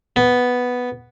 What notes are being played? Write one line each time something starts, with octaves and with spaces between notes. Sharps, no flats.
B3